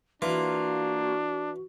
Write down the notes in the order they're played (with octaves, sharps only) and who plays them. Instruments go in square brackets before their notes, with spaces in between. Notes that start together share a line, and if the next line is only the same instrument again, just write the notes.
[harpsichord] E3 [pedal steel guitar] A#3 F4 [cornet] D4 [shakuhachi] F#4